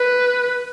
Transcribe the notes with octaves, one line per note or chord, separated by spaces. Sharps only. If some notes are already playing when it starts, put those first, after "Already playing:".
Already playing: B4